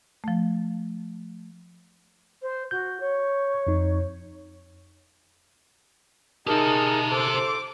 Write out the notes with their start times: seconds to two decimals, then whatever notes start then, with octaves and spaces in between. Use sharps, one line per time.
0.24 F3 A3
2.42 C5
2.71 F#4 G6
3.00 C#5
3.67 F2 D#4
6.47 D#4 G4 G#4 A#4 E5 A5
7.12 A4 C5 D6